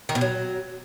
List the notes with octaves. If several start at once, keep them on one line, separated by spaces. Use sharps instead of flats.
D#3
B2
F#3